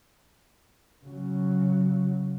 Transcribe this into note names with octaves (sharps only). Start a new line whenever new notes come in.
C#3 F#3